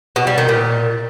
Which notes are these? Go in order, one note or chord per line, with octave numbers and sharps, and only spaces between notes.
B2
G3
D#3
A#2